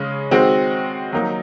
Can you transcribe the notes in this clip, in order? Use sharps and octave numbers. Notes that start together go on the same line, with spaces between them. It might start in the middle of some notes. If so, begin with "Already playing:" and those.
Already playing: C#3 G#3 C#4
D#3 G#3 C4 F#4
D#3 F#3 A#3 D#4